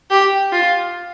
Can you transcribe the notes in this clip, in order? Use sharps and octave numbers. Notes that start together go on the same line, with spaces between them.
G4
F4